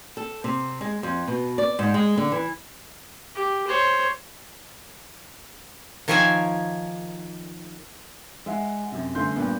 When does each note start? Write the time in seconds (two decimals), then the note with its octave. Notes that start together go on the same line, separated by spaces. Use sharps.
0.17 A4
0.44 C3
0.81 G#3
1.03 F2
1.27 B2
1.58 D5
1.79 G#2
1.94 G#3
2.18 D3
2.32 E3
3.35 G4
3.67 C5 C#5
6.08 D#3 F3 C#5 E5 G#5 A#5
8.46 G#3 E5 F#5
8.92 F#2 C3
9.15 G1 A3 C#4 C6 G6
9.36 G2 A#2 B3